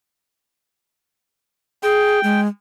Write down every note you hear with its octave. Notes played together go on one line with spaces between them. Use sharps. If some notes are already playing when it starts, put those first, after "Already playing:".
G#4 G5
G#3